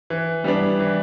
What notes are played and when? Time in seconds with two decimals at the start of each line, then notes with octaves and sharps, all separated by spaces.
0.10 E3
0.44 G3 B3 D4
0.79 E3